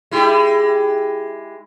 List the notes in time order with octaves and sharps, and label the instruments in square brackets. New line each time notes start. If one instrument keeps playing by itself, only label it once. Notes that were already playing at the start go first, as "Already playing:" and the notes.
[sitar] G#3 E4 G4